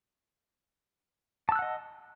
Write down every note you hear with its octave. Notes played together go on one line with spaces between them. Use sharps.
D#5 F#5 A5 E6 F#6